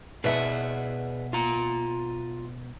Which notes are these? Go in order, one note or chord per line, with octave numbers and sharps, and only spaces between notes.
B2 G#4 B4 D5 E5 F#5
F4 A#5